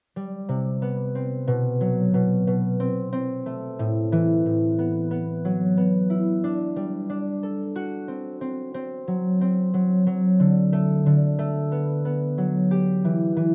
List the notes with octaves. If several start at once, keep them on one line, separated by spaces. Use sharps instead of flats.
G3
C3
B3
C4
B2
F#3
B2
B2
C4
C4
A3
A2
E3
A2
B3
B3
F#3
B3
E4
D4
G3
D4
A4
F#4
C4
C4
C4
F#3
C4
F#3
F#3
D3
A3
D3
A3
B3
B3
F#3
G4
E3
E3